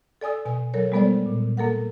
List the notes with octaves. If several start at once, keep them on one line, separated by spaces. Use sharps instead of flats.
A4 D5 G#5 D#6 E6
B2 G#5
F#3 A4 A#4 C#5
G3 G#3 B3 A4 C5 D5
A#2
A#3 A4 A#4 F#5